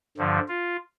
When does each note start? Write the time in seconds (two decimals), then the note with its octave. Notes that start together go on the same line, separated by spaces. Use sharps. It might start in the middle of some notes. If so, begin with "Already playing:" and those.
0.18 G2 D3 F3
0.48 F4